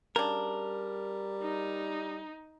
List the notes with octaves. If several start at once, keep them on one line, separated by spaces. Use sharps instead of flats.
C#3 G3 D4 A#4
D#4